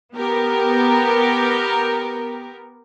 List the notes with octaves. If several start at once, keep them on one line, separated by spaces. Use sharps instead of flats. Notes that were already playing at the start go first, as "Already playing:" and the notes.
B3 G4 A#4